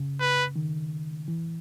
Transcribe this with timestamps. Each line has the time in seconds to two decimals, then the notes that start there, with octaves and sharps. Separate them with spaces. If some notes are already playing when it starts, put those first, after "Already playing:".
Already playing: C#3
0.20 B4
0.56 D#3
1.28 E3